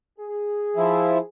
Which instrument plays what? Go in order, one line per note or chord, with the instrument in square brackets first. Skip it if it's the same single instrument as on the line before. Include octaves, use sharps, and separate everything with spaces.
[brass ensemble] G#4
[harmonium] F3 E4